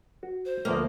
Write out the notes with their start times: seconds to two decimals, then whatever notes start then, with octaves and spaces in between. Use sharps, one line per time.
0.23 F#4
0.45 C5
0.65 D2 F3 A#3 B3